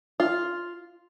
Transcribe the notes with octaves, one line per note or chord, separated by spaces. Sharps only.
F4